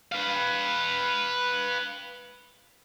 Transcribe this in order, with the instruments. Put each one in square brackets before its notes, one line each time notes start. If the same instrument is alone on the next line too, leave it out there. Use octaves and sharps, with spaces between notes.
[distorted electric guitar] B4 F5